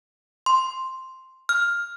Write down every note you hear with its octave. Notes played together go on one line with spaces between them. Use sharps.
C6
F6